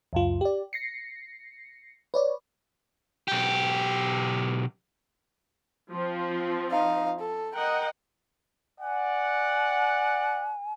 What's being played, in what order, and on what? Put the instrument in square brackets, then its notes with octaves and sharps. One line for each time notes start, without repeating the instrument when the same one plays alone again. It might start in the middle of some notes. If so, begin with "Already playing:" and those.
[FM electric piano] C#2 F#2 F4
G4 D5
A#6 C7 C#7
B4 C#5 D5
[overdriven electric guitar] B1 G4
[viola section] F3 C4
[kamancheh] D#4 F5
A4
[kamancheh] A#4 [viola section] D#5 F#5 G5
[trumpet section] D5 F#5 [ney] G#5